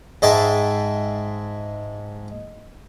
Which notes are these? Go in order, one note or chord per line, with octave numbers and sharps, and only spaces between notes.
G#2 G#3 G#4 E5 G5 A5